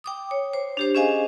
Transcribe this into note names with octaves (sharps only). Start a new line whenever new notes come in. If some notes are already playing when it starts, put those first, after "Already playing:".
G5 D6 D#6
C#5
C5
D4 G4 C5
C#4 G#4 C5 D#5 F5 G#5